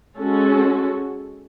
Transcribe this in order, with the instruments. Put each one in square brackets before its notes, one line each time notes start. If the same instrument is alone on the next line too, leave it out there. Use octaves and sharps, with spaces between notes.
[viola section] G#3 C#4 F#4 A4